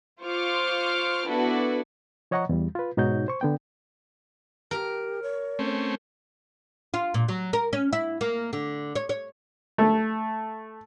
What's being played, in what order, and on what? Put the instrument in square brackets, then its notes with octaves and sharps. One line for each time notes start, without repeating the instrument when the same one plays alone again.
[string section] F4 C5 C#6 D6 F6
B3 D4 E4 F#4 A4 B4
[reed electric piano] F3 C#5 D#5 F#5 A#5 C#6
E2 G3
F4 B4
G#2 B2 D#4 F#4 C#5 G6
C5 C#6
D3 B3 G5
[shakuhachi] G4 [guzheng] A#4
[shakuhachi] C#5
[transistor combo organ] A3 C4 C#4
[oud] F4
A#2
F#3
A#4
C#4
E4
A#3
D3
C#5
C#5
[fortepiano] A3